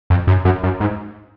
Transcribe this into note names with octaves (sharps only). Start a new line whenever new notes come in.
F2
F#2
F#2
F#2
G#2